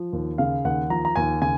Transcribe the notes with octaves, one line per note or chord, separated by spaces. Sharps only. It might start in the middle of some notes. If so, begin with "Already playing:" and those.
Already playing: F3
D#2
C#3 F5
D#2 F#5
F3 A#5
A#5
D#2 G#5
C#3 G#5